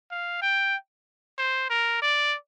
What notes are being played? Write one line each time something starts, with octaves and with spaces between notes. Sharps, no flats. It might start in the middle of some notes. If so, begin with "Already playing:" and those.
F5
G5
C5
A#4
D5